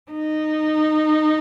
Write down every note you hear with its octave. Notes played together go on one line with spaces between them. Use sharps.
D#4